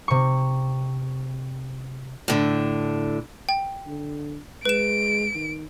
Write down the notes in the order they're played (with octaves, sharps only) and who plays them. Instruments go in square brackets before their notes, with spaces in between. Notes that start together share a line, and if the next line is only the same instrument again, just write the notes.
[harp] C3 C#6
[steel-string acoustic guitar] A2 D3
[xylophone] G5
[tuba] D3
[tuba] G#3 [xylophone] B4 E7 [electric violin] D7
[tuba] D#3